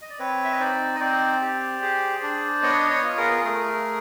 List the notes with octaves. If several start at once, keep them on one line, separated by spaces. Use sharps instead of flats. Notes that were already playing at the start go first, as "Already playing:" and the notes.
D#5
D5
C4 B4 C#5
E5
D#5
D#4 C5 D5
D#5
C4 C5 D5
G4
G#4
D4
B3 C#5 D#5
C#5 D#5
F4
G#4 A#4
A3 G#4 A#4